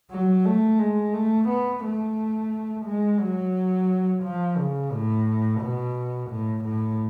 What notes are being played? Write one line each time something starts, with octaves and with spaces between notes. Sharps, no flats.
F#3
A3
G#3
A3
B3
A3
G#3
F#3
F3
C#3
A2
B2
A2
A2